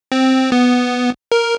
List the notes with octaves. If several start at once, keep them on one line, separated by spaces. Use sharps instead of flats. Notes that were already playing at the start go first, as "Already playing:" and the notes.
C4
B3
A#4